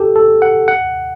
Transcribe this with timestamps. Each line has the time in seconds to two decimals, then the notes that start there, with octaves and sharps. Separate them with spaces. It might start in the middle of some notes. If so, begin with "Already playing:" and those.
Already playing: G4 A4
0.16 A4
0.42 F#5
0.68 F#5